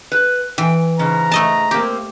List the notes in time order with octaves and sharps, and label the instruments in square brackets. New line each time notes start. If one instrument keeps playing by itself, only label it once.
[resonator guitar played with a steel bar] B4
[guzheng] E3 [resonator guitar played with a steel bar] G5
[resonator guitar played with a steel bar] G#2 C#3 [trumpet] A#5
[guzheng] A3 D#5 A5
[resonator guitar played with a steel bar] A#3 C4 [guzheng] G4